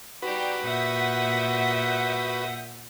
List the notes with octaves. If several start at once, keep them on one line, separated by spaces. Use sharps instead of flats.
G3 D#4 F#4 G4 B4
A#2 E5 F#5 D#6 G6